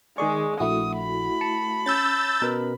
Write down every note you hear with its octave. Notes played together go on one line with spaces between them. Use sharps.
D#3 G#3 G#4 D5 C#6
A#1 A3 E4 F#4 D#6
B5
A5 C#7
C#4 E6 G6 A6
B2 A#4 B4